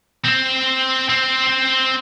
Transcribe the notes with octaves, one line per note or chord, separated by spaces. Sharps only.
C4
C4